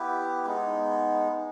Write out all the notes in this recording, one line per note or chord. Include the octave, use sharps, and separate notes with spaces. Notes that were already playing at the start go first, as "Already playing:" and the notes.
Already playing: B3 E4 G4 B4
G#3 B3 D#4